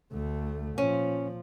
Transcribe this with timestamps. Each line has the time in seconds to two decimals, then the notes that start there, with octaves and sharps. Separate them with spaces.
0.12 D2 A3
0.78 A#2 F3 C#4